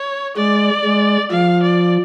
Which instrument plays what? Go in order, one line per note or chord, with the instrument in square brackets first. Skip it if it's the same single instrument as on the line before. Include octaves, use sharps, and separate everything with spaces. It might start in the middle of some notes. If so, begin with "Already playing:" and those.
Already playing: [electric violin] C#5
[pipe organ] G#3 [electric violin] D5
[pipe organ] G#3
[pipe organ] F3 [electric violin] F5
[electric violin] D5